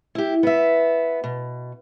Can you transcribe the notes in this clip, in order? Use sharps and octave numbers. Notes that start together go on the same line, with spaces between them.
E4 G4
B3 E5
B2